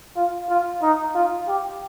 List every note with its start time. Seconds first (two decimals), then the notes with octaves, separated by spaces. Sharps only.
0.16 F4
0.49 F4
0.82 D#4
1.15 F4
1.48 G4